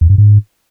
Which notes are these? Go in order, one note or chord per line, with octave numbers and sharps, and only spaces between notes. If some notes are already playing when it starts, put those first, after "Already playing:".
E2
G2
G#2